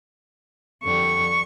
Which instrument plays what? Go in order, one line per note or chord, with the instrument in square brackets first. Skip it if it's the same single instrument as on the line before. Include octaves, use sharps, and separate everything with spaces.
[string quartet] F2 D3 G3 C#6